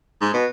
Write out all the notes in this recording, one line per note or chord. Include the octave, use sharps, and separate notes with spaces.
G#2
B2